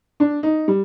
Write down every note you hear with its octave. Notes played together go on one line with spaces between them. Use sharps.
D4
D#4
G3